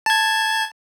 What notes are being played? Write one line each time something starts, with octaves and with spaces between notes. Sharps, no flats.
A5 G#6